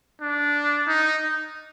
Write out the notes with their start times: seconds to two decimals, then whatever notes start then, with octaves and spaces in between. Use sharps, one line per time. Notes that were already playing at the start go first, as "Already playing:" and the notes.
0.21 D4
0.88 D#4